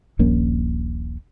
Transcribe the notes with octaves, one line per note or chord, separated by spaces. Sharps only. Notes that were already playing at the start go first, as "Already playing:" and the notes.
D#1 A#1 A#3 C#4